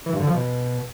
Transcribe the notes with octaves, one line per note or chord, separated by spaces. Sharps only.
E3
G2
D3
F3
B2